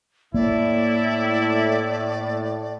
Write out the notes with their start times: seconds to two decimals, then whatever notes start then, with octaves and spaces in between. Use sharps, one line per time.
0.34 A2 A#3 E4 D5